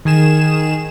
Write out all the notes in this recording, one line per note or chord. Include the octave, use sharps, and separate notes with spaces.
D#3 G#4 E7